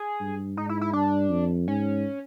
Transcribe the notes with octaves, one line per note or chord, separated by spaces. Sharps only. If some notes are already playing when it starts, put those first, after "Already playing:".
Already playing: G#4
G2
G#2 D#4
E4
E4
G2 D4
F2
G#2 C#4